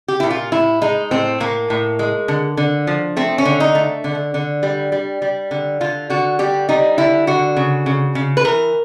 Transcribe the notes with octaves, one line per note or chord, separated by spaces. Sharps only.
G4
A#2 E4
F4
A2 E4
G#3 D#4
A2 C4
A2 A#3
A2
G#3
D3
D3
F3
A3 C4
C#4
D3
D#4
A3
D3
D3
G3
G3
G3
D3
D3 F4
D3 F#4
G3 G4
G3 D#4
D3 E4
D3 F#4
C#3
C#3
C#3
B4
E3 A#4